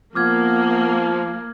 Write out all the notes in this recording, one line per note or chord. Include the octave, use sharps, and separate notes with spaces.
F3 A#3 B3 D6 F6 G#6